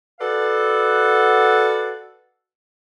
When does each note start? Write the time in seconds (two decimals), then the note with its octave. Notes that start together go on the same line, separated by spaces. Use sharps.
0.20 F#4 A4 B4 D5 F5 F#5